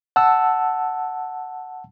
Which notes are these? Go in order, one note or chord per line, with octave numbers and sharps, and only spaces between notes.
F#5 A5 E6